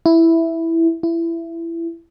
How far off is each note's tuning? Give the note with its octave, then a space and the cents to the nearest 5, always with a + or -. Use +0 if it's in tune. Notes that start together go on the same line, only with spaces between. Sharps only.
E4 +0
E4 +20